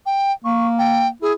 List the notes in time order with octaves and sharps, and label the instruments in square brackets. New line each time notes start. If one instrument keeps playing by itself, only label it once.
[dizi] G5
[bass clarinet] A#3 [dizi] C#6
[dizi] G5
[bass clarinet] E4 [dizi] G#4